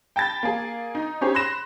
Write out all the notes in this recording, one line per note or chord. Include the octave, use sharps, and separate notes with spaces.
G5 A5 B5 A6
A#3 G#4
D#4
C#4 D#4 G4 G#4 C5 C#5
B5 C6 F#6 A#6 E7